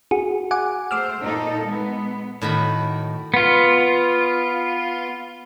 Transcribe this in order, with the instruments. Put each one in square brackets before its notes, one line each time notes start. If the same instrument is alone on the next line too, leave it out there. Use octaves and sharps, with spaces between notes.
[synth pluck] F#4 G#4
F#5 G#5 D6
[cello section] A3 C5 [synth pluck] D6 E6 F6
[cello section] A#2 D#4 A4
G#3 B3
[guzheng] A2 D#3 F#4 B5
[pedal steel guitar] B3 F4